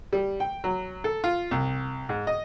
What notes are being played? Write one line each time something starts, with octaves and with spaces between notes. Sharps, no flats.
G3
G5
F#3
A4
F4
C2
G#2
D#5